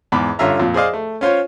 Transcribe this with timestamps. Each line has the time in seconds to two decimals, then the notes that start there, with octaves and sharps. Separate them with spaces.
0.12 E2 G#2 B5 D6
0.39 G2 D3 C#4 F4 E5 A#5
0.60 F2 A#2
0.74 G#4 C5 D5 D#5 F5
0.93 A3
1.21 C#4 F4 C5 C#5